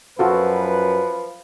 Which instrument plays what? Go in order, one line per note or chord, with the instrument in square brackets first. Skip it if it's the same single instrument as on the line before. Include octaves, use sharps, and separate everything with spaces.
[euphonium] F#2 [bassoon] F3 [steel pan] F4 F#4 A4 [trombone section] B4